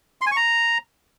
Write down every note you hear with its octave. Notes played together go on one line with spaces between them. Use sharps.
C6
G#5
C#6
A#5